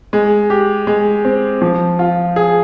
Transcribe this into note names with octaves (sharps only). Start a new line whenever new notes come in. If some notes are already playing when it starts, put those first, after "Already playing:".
G#3
G4
G#3
C4
F3
F4
G#4